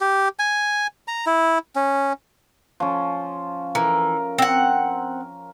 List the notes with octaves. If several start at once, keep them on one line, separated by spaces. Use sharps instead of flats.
G4
G#5
A#5
E4
C#4
F3 C#4
E3 A#4
C4 F#5